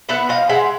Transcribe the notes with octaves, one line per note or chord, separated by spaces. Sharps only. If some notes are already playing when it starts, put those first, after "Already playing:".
B3 E5 F#5
F3 D#5 F5
G#3 E5 F#5